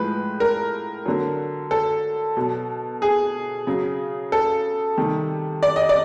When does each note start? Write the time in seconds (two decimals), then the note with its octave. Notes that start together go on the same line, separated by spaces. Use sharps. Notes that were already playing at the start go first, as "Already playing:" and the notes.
Already playing: A2 F3 G#3 B4
0.40 A#4
1.05 D3 F#3
1.71 A4
2.37 B2 F#3
3.02 G#4
3.67 C#3 F#3
4.32 A4
4.97 C3 D#3 G3
5.63 D5
5.76 D#5
5.89 D5